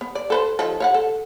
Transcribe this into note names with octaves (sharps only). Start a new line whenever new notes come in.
B3
D5
A4 B4 C5
D#3 F3 A4
C#5 F5 F#5
A4